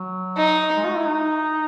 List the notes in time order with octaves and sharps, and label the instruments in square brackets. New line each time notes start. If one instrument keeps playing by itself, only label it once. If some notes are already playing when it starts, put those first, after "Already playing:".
Already playing: [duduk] F#3
[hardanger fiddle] D#4
[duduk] G#3
F#4
E4
D#4